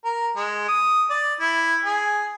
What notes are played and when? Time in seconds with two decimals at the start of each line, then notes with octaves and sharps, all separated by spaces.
0.05 A#4
0.36 G#3
0.68 D#6
1.10 D5
1.40 E4
1.84 G#4